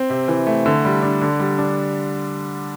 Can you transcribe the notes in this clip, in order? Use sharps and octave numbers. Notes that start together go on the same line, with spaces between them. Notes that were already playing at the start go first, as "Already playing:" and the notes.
Already playing: C4
C3
E3
A3
D3
G3
D4
D3
G3
D4